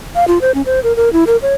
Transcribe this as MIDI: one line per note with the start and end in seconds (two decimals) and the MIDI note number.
0.15 0.25 77
0.28 0.38 65
0.41 0.54 72
0.54 0.62 61
0.66 0.80 72
0.84 0.95 70
0.96 1.12 70
1.13 1.24 64
1.27 1.37 70
1.42 1.54 73